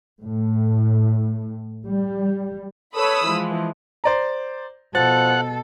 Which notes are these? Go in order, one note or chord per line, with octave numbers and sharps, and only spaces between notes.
A2
G3
A4 B4 C#5 B5 D#6 E6
E3 F3 G#3
C5 D5 A#5
B2 F3 A4 F#5 A6